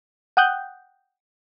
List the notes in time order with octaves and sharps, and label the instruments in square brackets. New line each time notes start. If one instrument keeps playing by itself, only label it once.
[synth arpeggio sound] F#5 G5 D#6 F#6 G6